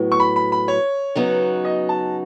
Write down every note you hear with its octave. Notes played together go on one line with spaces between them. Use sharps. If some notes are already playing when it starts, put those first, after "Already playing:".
Already playing: A2 F#3 B3
C#6
B5
B5
B5
C#5
C#3 F#3 B3 D#4 F#4
D#5
A5